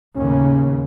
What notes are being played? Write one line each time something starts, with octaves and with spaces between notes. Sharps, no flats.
D#2 A2 C#3 C#4